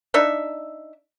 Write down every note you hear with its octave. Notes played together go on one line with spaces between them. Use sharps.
D4 D#4 E5